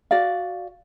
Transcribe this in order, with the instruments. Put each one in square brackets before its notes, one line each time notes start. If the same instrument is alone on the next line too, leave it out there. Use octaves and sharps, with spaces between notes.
[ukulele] F#4 D5 F5